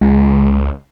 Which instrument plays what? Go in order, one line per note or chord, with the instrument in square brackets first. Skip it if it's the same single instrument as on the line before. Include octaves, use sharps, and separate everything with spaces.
[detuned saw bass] C#2 [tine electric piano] G#3